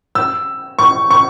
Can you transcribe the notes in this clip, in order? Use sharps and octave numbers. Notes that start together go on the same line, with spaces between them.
E6
C#6
C#6